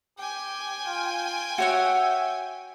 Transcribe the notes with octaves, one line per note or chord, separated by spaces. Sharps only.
G4 G5 G#5
F4
F#4 C#5 E5 F#5